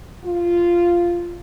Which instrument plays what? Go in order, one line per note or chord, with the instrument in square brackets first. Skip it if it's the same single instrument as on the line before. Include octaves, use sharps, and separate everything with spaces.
[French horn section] F4